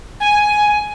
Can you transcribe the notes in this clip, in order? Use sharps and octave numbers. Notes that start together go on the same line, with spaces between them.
G#5